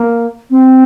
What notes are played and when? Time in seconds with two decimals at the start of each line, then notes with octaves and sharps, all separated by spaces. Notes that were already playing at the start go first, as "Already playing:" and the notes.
Already playing: A#3
0.50 C4